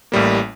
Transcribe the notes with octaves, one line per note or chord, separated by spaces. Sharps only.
A1 A2 G3 A#3